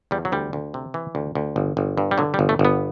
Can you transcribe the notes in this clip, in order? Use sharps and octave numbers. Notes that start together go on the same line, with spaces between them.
E2 G3
F#3
D2 G3
D2
C3
E3
D2
D2
G1
G1
G2
G3
D3 F#3
G3
G1
A3
G1
B3